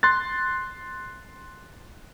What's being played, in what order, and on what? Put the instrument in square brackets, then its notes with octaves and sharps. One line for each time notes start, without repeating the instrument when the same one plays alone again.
[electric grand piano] C6 F#6 A6